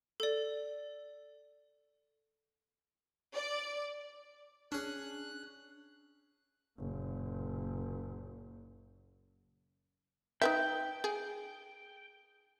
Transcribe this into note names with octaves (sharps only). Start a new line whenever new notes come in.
A4 D5
D5
C#4 D4 G#4 F#6
F#1 A#2
D#4 B4 E5 G5
G#4